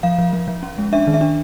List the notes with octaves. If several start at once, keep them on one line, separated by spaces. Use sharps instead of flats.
F3 F5
F3
F3
F3
C#4
G#3
D4 E5
D#3
E5
D4